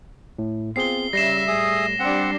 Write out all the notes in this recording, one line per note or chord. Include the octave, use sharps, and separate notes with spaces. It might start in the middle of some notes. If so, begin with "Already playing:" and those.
A2
B3 C4 F4 G#4 C7 G7
C#3 G3 E5 A#6 C7 E7
A2 G#4 E5 D#6
G3 C4 D4 F#5